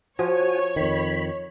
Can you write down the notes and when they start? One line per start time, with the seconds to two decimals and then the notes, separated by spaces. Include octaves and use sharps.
0.19 F3 F#4 C#5 G#5
0.76 F2 D#3 B5